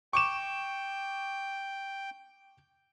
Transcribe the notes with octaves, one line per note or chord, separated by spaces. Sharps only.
G5 C#6 D6 E7